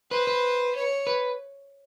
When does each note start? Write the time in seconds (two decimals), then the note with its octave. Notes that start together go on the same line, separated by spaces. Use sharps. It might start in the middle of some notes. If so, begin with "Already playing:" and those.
0.11 B4 C5
0.27 B4
0.75 C#5
1.07 B4